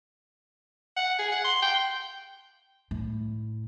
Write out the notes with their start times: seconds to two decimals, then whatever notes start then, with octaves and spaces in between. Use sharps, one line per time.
0.97 F#5
1.19 G#4
1.32 F#5
1.44 C6
1.62 G5
2.91 A2